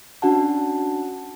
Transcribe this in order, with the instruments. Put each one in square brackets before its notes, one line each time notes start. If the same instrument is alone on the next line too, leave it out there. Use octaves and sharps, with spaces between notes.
[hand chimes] C#4 D4 F#4 F#5 A5